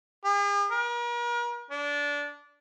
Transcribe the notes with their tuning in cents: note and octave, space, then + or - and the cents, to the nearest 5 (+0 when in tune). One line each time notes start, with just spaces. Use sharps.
G#4 -45
A#4 +40
D4 -20